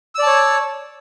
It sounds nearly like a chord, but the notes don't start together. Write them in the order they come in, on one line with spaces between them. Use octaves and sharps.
E6 D5 A5 C#5